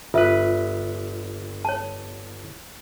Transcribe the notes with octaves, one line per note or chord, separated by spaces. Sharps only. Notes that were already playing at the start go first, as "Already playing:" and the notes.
G1 F4 B4 E5
C#5 A5